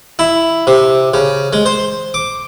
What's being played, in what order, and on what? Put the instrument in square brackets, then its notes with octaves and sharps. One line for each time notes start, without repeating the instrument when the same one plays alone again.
[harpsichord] E4
C3
C#3
G#3
C5
D6